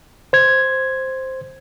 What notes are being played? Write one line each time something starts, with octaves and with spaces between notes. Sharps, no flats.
C5 G#6